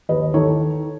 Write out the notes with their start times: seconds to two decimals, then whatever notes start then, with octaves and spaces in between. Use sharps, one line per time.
0.09 D#2 B4 D#5
0.34 D#3 A4 C#5